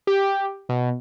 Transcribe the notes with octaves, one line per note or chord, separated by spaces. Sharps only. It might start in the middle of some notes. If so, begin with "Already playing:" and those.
G4
B2